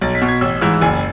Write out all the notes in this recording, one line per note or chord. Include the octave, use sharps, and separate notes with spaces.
B1 A6
B6
B2
G#6
A1 E6
G#2 E3 E6
F#1 G#5